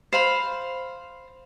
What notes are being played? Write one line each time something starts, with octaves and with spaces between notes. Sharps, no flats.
C5 F5 B5